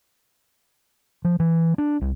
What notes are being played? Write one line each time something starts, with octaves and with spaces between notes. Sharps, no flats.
F3
E3
D4
C2